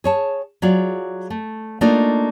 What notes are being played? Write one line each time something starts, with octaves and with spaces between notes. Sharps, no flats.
G#4 C#5 A5
F#3 F4 G#4 D5
A3
A3 A#3 D4 D#4 F4 D#5